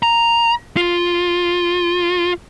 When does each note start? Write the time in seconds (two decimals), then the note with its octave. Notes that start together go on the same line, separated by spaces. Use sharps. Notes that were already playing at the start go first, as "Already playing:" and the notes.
0.03 A#5
0.77 F4